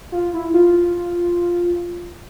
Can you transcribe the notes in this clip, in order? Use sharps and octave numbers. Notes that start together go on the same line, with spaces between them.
F4
E4
F4